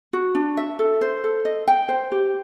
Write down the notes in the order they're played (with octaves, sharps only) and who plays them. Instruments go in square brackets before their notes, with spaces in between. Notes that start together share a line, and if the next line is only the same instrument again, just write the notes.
[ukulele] F#4
D4
E5
A4
C5
A4
D#5
G5
C5
G4